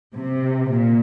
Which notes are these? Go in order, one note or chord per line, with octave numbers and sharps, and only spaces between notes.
C3
A#2